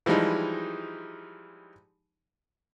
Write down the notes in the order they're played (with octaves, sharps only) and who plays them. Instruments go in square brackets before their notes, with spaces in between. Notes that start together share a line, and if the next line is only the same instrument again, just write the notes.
[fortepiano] E3 F3 G3 G#3 D#4